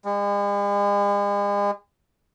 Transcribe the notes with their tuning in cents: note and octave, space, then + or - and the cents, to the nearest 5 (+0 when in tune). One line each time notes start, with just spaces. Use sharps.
G#3 -45